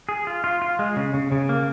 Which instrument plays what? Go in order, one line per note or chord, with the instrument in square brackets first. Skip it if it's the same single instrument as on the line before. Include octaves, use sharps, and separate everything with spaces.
[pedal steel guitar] G#4
F4
F4
F4
G#3
C#3
C#3
C#3
A#3